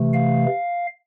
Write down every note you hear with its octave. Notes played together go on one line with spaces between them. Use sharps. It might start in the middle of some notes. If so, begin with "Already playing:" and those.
Already playing: C3 E3 A3
F5